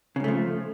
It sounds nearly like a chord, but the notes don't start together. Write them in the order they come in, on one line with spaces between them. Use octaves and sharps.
C#3 G#2 A3 F3